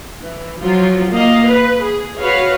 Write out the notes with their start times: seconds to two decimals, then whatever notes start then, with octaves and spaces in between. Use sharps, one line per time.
0.22 E3
0.60 F3 F#3 F4
1.11 A#3 D#5 F5
1.48 B4
1.82 G#4
2.18 F#4 B4 C#5 F5